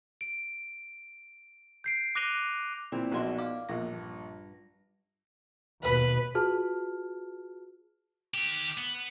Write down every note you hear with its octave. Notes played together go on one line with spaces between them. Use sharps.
D7
G6 C7 D7
D6 F#6 A#6 D#7 F7 G7
A#2 E3 C4 D5
A#1 B3 D#4 F#4 A#4 D5 D#5 C6
F5 D6
A#1 E2 A#3 A#6
G2
D#2 B2 B4
F4 F#4 G#4 B4 A5 F6
D#3 G4
B3